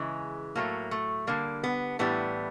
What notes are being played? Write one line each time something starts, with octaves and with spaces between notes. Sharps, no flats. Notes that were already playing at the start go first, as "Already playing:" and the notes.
Already playing: C#3 E3 G#3
A2 F#3 A3 A#3
A3
D3 G3 A#3
B3
A2 E3 G3 B3